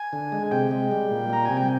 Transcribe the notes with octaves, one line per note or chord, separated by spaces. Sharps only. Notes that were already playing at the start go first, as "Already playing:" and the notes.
Already playing: G#5
D3
G#3
C3 G5
G#3
G3
A#2
G3 A#5
C3 G#5
G5